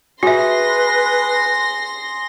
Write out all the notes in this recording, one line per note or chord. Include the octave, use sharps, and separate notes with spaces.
F#4 G#4 B4 E5 C6 A#6